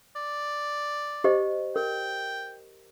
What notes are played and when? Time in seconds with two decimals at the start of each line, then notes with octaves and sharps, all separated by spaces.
0.16 D5
1.24 G4 C5 D#5
1.76 A#4 G5